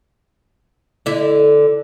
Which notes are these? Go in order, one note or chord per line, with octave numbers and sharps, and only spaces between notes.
D3 E4